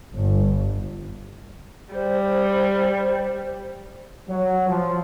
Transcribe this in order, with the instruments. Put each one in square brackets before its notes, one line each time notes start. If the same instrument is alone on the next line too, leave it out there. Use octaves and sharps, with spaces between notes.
[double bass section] G1
[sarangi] G3 [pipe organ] C5
[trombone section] F#3
F3